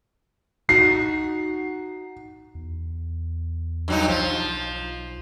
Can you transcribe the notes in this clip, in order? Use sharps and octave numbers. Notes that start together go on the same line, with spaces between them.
D#4 F#4 F#5 C7
E2
G2 F#3 D#4
B1 F3